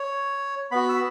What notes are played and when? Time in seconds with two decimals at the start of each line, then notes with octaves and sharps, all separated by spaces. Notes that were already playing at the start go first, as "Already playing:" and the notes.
Already playing: C#5
0.71 B3 F#4 B5
0.89 E6